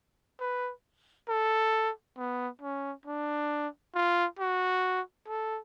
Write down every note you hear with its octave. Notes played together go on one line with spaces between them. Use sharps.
B4
A4
B3
C#4
D4
F4
F#4
A4